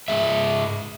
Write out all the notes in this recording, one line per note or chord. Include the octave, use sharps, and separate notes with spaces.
G#2 D#3 G#3 E5